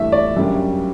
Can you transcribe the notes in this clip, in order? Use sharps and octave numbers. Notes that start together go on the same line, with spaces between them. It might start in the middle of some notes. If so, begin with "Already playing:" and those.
Already playing: G2 E3 A3 D4 E5
D5
F#2 C#3 G3 D4